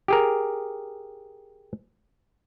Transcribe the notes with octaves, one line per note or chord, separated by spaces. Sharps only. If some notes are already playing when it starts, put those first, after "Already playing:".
G4 G#4 A#4